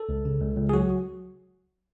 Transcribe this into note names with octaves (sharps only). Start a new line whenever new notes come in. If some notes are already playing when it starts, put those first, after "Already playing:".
Already playing: A4
C#2
C#3
C#2
C#2
G#4
F#3 F#4